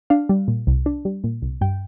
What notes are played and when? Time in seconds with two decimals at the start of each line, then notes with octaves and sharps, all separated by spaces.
0.10 D4 F5
0.29 G3
0.48 A#2
0.67 C2
0.86 D4
1.05 G3
1.24 A#2
1.42 C2
1.61 G2 G5